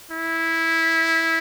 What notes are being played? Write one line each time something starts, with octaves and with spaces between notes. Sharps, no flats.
E4